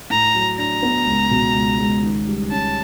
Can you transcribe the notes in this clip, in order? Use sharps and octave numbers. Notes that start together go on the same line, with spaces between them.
A2 A#5
F#3
D4 A#5
B3
C#2
B2
C#2
G#3
D#3
G3
C#4 A5